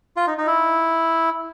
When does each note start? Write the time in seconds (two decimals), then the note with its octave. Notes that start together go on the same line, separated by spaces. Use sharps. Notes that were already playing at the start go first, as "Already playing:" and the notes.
0.17 F4
0.27 D#4
0.38 D#4
0.47 E4